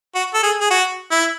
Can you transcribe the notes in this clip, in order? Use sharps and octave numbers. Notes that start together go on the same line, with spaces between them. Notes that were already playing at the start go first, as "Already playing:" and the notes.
F#4
A4
G#4
G#4
F#4
E4